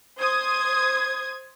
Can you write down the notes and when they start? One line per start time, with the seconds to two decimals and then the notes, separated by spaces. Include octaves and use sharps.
0.19 C5 D#6 G#6